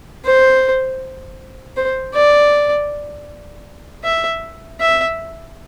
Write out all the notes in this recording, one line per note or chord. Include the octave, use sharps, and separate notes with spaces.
C5
C5
D5
E5
E5